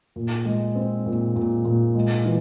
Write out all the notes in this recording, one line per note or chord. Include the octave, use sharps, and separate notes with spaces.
A#2
G#3
C4
A#2
A#2
A#2
G#3
E3